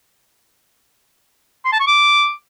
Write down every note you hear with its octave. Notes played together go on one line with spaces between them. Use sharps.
C6
A5
C#6
D6